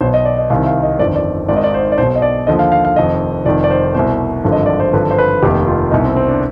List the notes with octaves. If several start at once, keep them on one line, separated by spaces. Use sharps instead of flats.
B1 B2 C5
D#5
D5
D#5
C2 C3 D#3 F5
F5
D#5
G1 F2 D#3 D5
D5
G#1 G#2 D#3 D5
D#5
D5
C5
D5
B1 B2 C5
D#5
D5
D#2 D3 F3 D#5
F5
F5
F5
F1 F2 D#3 D#5
F1 F2 D#3 D5
D5
C5
C2 B2 C5
G#1 G2 D3 F3
D#5
D5
C5
G#1 G2 D3 F3 B4
C5
B4
F1 D#2 D#3 G4
F4
C2 B2 D#4
C4
C4
D4